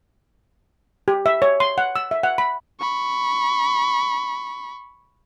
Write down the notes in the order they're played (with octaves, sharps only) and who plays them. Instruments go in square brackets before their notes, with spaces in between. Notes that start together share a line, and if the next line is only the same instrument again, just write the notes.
[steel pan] G4
E5
C#5
C6
F#5
E6
E5
F#5
B5
[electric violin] B5 C#6